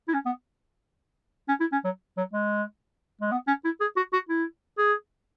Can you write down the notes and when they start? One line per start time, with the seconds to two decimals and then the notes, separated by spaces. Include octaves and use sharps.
0.08 E4
0.14 C#4
0.26 B3
1.48 C#4
1.60 E4
1.72 C#4
1.84 F#3
2.17 F#3
2.33 G#3
3.21 G#3
3.32 B3
3.48 C#4
3.65 E4
3.81 G#4
3.97 F#4
4.13 F#4
4.29 E4
4.78 G#4